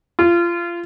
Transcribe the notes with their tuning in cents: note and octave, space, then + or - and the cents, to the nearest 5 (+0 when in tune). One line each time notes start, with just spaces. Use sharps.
F4 -25